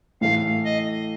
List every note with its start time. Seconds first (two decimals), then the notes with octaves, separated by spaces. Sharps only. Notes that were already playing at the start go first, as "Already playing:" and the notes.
0.21 A2 E3 A3 F5
0.65 D#5